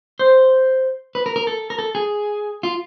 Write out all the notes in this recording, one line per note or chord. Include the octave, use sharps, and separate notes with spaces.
C5
B4
A#4
A#4
A4
A#4
A4
G#4
F4